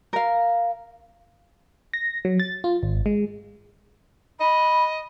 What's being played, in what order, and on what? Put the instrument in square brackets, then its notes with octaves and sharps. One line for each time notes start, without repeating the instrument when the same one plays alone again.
[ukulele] A#4 F5
[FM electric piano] A#6
F#3
A6
F4
G#1
G#3
[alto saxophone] D#5 [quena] B5